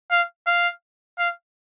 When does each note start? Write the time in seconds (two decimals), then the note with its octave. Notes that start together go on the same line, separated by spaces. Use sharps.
0.11 F5
0.47 F5
1.18 F5